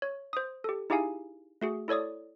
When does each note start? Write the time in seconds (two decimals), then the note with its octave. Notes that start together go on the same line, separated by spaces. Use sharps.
0.02 C#5
0.33 C5 D#6
0.64 G4 A4
0.90 D#4 E4 G4 G#4 F5 G#5
1.62 A3 F#4 G#4
1.88 E4 A4 C#5 D5 D#6